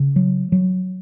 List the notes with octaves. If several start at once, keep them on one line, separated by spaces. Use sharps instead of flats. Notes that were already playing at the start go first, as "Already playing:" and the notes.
Already playing: C#3
F#3
F#3